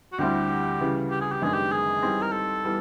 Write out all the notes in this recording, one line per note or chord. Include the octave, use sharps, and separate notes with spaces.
F#4
D2 D3 G3 C4 E4 G4
C#3 E3 G3
G4
G#4
G4
F#2 D#3 G#3 B3 D4 G#4
G4
G#4
E3 G3 C4 D#4
A#4
A4
E3 G3 B3